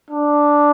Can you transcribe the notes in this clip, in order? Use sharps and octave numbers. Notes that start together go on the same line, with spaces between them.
D4